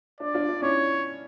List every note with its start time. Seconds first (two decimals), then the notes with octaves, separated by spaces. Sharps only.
0.20 D4 D5
0.34 D4 F4
0.49 D4
0.62 C#4 E4 C#5